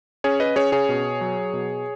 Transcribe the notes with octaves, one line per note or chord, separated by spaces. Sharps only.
C#4 G#4 C#5
B4 D#5
C#4 G#4 C#5
G#4 C#5
B2
F#3
B2